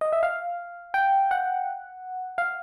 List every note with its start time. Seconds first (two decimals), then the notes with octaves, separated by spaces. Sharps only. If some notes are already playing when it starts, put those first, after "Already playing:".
0.01 D#5
0.12 E5
0.23 F5
0.94 G5
1.31 F#5
2.38 F5